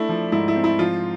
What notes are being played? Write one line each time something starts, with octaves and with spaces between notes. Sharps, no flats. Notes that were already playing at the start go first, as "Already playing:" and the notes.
Already playing: A3 D4 E4
F3
G#2 E4
E4
C4
E4
F3 F4